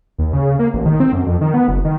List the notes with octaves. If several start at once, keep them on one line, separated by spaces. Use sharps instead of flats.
D#2
C#3
A#3
A1
D#3
C4
F#2
F2
D#3
B3
F#1
D#3